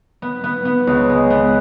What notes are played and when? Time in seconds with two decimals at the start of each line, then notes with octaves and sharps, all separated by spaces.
0.22 B3
0.44 B3
0.65 B3
0.87 C#2
1.09 G#3
1.30 B3